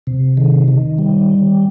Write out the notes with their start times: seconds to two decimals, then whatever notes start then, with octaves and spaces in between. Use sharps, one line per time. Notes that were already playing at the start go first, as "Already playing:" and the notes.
0.07 C3
0.37 D#3
0.68 D#3
0.98 G3